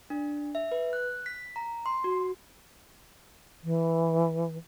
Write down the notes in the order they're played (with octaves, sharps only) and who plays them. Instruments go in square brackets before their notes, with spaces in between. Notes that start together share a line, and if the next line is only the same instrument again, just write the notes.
[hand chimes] D4
E5
B4
F#6
B6
A#5
C6
F#4
[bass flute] E3